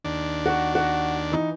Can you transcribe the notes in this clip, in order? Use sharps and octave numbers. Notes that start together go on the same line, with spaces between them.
D#2 D4
F#4
F#4
E3 D#4